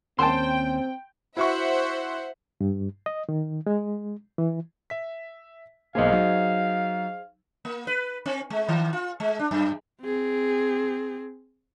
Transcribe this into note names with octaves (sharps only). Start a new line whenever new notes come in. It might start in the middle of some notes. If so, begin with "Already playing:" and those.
D#2 C4 C#4 C5 G5 A5 C6
E4 F#4 C5 E5 F#5 C#6
G2
D#5
D#3
G#3
E3
E5 B6
B1 A#3 G#4 C5 D#5 F5
F#3 D#4
A#3
B4
C4
G#3
D#3
F4
G#3
D4
F#2
C4 G#4